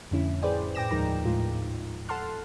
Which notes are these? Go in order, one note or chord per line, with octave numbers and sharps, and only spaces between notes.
F2 A2 D3 C#4 E4
G#4 B4 C5 D5 G5
A2 G5 D6 A#6 E7
D#2 G#2 F3 D#4 A#4 A#5
A2 G#3 F4
A4 F#5 A5 C6 F6